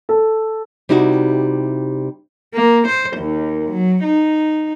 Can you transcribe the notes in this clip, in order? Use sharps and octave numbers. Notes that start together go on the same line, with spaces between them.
A4
C3 G3 D#4 E4 F#4
A#3
C5
D#2
F#3
D#4